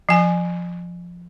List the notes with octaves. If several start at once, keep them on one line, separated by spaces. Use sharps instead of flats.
F3 G#5